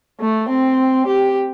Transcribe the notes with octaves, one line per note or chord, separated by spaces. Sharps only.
A3
C4
G4